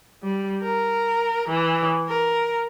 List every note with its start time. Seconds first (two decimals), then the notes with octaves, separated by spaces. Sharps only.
0.23 G3
0.63 A#4
1.49 E3
2.09 A#4